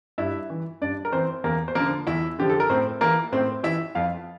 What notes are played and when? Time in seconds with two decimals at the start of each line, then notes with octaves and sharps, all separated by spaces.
0.18 G2 E4 E5
0.50 E3
0.81 G2 D4 D5
1.05 A#4
1.12 E3 C4 C5
1.44 E2 A#3 A#4
1.68 C5
1.75 D3 F3 A#3 A#4
2.07 E2 E4 E5
2.39 D3 F3 G4
2.50 A4
2.60 A#4
2.69 A2 C4 C5
3.01 E3 A#3 A#4
3.32 A2 C4 C5
3.63 E3 E4 E5
3.95 F2 F4 F5